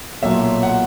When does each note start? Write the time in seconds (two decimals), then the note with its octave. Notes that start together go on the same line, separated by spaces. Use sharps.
0.22 B1 A#2 F#3 E5
0.63 F#5